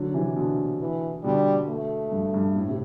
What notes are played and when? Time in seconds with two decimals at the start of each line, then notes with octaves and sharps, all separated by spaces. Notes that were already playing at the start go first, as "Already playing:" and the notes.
Already playing: D3 F#3
0.14 C3 E3
0.36 B2 D3
0.80 E3
1.24 B2 D3 G3
1.68 A3
2.12 G2
2.34 G2
2.56 A2
2.69 C3